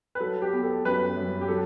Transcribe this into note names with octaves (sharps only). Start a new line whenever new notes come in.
B4
F#3 A4
G4
B3
A4
F#2 B4
F#2
G4
F#3 A4